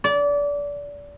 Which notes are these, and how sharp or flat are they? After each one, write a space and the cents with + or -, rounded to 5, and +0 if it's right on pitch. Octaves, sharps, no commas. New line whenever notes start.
D5 -25